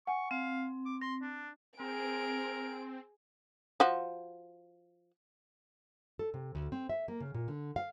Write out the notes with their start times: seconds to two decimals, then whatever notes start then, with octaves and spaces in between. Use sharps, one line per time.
0.07 F#5 G#5 C#6
0.31 C4 F5
0.86 D6
1.01 C6 A#6
1.22 D4
1.80 C4 G#4 A#4 D7
3.80 F3 F#4
6.19 A4
6.34 C3
6.55 D2
6.72 C4
6.89 E5
7.08 A#3
7.20 C#3
7.34 A#2
7.48 D3
7.76 F5